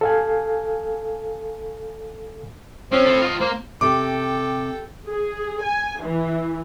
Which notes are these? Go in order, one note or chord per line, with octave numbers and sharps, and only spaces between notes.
A4 F5 G#5
F3 C4 C#4
E4 A4
F4 D#5
A#3 C5
C3 A4 G5 D6
G#4
G#5
E3